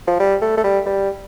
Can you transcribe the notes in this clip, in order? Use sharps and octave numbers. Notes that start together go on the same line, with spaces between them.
F3
G3
A3
A3
G3
G3